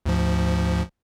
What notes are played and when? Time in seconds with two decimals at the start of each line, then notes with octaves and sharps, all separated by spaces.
0.06 D2 G#2 F3